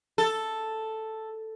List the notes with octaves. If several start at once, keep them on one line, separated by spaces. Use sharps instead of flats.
A4